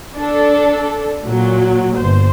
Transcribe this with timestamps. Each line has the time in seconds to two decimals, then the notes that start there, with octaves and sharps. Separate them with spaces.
0.17 D4 A4
1.24 A#2 F#3
1.97 G1 C5